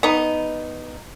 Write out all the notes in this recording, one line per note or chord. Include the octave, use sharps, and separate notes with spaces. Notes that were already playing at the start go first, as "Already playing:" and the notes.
B3 D#4